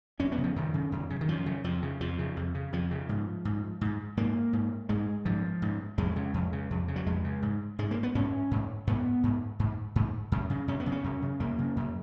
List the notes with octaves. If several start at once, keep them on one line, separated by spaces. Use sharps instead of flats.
F#2 C#4
B3
C#3
F3
F#2 D#3
C#3
F#2
C#3
D#3
F#2 F3
C#3
F2 F3
C#3
F2 F3
C#3
F2
C#3
F2 F3
C#3
G#2
G#2
G#2
G#2 A#3
G#2
G#2 G#3
G#2 F3
G#2
F2 G#3
C#3
F2
C#3
F2
C#3
F#3
F2 G#3
C#3
G#2
G#2 G#3
A#3
B3
G#2 C#4
G#2
G#2 B3
G#2
G#2
G#2
F#2
C#3
F#2 C#4
B3
C#3
C#4
F#2
C#3
F#2 A#3
C#3
F#2